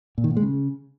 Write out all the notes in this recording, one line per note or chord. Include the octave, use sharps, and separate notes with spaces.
A#2
D#3
A#2
G#3
C#3